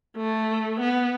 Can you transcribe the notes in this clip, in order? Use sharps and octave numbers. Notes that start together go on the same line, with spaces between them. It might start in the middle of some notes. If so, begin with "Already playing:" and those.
A3
B3